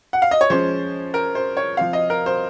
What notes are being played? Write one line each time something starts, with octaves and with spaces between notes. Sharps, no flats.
F#5
F5
D#5
C#5
F3 G#3 C#4 C5
A#4
C5
C#5
F3 C4 F5
D#5
A#4
C5